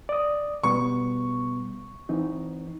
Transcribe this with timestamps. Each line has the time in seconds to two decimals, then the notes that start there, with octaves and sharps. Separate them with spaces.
0.09 D5 D#6
0.63 B2 G3 B3 C#6
2.09 E3 C4 D#4